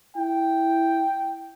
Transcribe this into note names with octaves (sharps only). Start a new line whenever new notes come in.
E4 G5